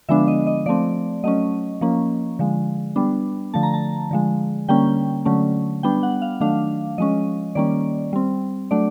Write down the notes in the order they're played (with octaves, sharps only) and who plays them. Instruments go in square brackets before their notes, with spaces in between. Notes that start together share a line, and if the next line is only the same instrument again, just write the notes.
[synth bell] D3 F3 G#3 B3 D4 E5
D#5
D#5
F3 A3 C4 D5
F#3 A3 C#4 D#5
F3 A#3 C#4
D3 F3 G#3
G3 B3 D4
D3 F3 A3 A5
A#5
A5
D3 F3 G#3
D3 G3 A#3 C#4 G5
D3 F#3 A3 C#4
G3 B3 D4 G5
F#5
F5
D#3 F#3 A3 D4 F5
F3 G#3 C#4 D#5
D#3 G3 A#3 C#4 D5
G3 C4
F#3 A3 D4 D5